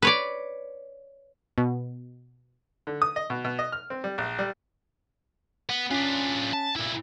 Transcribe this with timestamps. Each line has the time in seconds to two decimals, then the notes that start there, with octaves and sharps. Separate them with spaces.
0.02 B4 C#5 D5
1.58 B2
2.87 D3
3.02 D#6
3.16 D#5
3.30 B2
3.45 B2
3.59 D#5
3.72 F6
3.90 C4
4.04 G3
4.18 A#1
4.39 G3
5.69 B3
5.91 C#4 D4 F4 B6
6.53 A5
6.76 A#2 E4